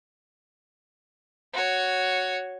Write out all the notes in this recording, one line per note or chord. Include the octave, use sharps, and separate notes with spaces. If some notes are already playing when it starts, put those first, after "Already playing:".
F#4 C#5